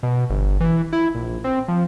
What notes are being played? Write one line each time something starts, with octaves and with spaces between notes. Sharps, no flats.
B2
G1
E3
E4
A#1
C4
F3